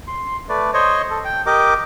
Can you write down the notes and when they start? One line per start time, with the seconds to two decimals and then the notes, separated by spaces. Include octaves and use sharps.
0.07 C6
0.49 A3 B4 D5
0.74 C5 C#5 D#5
1.10 A4
1.25 G5
1.46 G4 A#4 D#5 D6